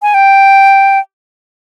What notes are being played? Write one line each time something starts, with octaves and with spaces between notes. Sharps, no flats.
G#5
G5